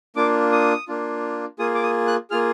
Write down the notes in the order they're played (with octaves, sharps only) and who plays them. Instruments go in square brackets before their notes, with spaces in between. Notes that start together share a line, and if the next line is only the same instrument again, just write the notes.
[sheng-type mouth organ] A#3 D4 F4 D6
D#6
A#3 D4 F4
A#3 F4 G#4 D#6
D6
D#6
F#6
A#3 F4 G#4 F6